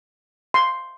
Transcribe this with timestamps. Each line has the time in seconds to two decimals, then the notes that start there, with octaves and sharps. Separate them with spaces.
0.54 C6